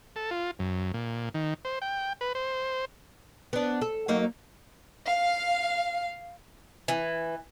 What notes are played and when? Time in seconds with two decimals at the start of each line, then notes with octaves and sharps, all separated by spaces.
0.16 A4
0.31 F4
0.59 F#2
0.94 A#2
1.34 D#3
1.65 C5
1.82 G5
2.21 B4
2.35 C5
3.53 B3 D4
3.81 A4
4.08 F#3 A#3 D#4
5.06 F5
6.88 E3